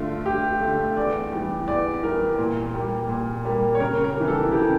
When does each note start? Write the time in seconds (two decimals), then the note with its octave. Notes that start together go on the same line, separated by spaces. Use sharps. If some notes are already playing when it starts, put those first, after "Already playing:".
Already playing: G2 D3 A3 F4
0.26 G2 G4
0.61 D3 A3
0.97 E2 D5
1.32 E3 G3
1.67 E2 D5
2.03 E3 G3 A#4
2.38 A#2
2.74 G3 A#3
3.09 A#2
3.45 G3 A#3
3.75 C#5
3.80 C#3 A#4
4.04 A#4
4.16 E3 G3
4.28 A4
4.51 C#3 G4